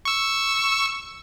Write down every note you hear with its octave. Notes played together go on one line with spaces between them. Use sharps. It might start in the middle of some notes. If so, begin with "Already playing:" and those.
C#6 E6